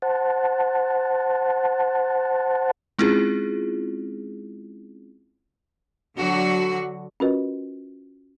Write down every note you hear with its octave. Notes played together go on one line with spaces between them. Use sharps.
C5 F#5 A5
G#3 C4 C#4 E4 F4 G#4
D3 F#3 F#4
C#4 F4 F#4 A#4 B4 D#5